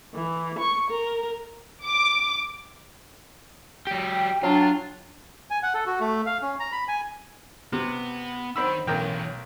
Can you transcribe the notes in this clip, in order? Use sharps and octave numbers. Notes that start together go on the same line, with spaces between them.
E3
C#6
A#4
D6
F#3 G4 G5
F#3 D4 F4
G#5
F#5
A4
F#4
A3
F5
C#4
A#5
B5
G#5
C3 B3
D#3 C4 B5 E6
B1 E3 C#4 A#4 G5